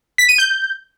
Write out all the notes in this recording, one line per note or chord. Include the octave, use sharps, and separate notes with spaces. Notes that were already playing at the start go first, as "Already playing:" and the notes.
B6
D#7
G6